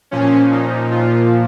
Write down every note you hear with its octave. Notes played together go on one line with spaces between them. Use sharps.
A#2 F3 C#4
D#4
F4